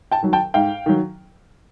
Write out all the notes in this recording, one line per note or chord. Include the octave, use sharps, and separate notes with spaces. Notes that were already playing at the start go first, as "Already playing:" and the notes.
G5 A5
D#3 F#3
G5 A5
G#2 F5 G5
D#3 F#3